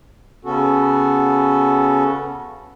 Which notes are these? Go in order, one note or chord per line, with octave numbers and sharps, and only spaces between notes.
C#3 B3 C#4 F#4 A4